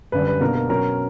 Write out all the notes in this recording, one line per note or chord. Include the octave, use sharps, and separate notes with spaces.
F#2 D3 G3 B4
B4
B2 A#3 D4 A#4
A#4
B2 F#3 C#4 A#4